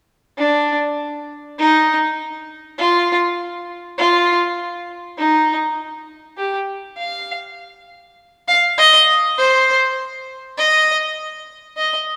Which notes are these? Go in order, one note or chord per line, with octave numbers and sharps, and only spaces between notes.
D4
D#4
F4
F4
D#4
G4
F5
F5
D#5
C5
D#5
D#5